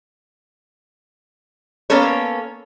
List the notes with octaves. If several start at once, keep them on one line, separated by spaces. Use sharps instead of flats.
A#3 B3 C#4 A4 C#5